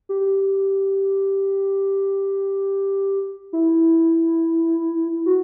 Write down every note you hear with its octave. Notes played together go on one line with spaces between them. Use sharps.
G4
E4
F#4